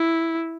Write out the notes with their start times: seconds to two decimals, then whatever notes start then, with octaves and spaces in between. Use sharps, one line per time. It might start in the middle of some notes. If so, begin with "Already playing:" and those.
Already playing: E4